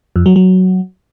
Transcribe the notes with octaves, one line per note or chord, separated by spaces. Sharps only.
F2
F#3
F#3